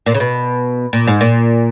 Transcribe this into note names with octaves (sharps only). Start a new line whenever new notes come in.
A#2
C#3
B2
A#2
G#2
A#2